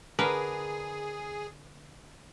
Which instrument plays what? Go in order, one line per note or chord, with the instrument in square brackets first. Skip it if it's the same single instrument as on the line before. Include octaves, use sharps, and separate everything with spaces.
[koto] D3 A#4 B4 [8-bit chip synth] G#4